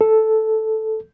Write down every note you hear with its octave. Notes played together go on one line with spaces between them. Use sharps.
A4